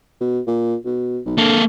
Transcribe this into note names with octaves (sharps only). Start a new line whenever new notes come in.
B2
A#2
B2
B1
D3 A#3 A4